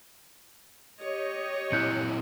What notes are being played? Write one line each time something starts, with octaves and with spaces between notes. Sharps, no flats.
G4 C#5 D#5
A#2 C4 E4 F#6 G6 C#7